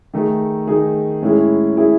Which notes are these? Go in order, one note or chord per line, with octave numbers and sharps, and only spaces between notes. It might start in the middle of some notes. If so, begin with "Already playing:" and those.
D#3 A3 D#4 G#4
D#3 A3 D#4 G#4
A2 G#3 C#4 E4 G#4
A2 G#3 C#4 E4 G#4